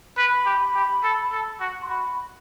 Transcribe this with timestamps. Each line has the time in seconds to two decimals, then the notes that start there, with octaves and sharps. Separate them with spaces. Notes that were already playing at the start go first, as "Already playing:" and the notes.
0.17 B4 B5
0.46 G4
0.75 G4
1.03 A4
1.32 A4
1.60 F#4
1.83 C6
1.89 F#4 B5